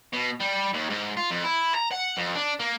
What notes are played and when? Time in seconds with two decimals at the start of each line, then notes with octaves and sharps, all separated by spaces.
0.13 B2
0.40 G3
0.73 D#2
0.90 G#2
1.17 F4
1.30 F2
1.43 E4
1.74 A#5
1.91 F#5
2.17 F2
2.35 D4
2.60 A#3